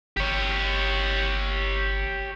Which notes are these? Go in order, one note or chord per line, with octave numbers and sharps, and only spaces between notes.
G1 G4 C#5